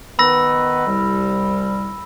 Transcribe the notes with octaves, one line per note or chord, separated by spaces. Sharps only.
D#3 B3 B4 B5 E6 A#6
C2 G3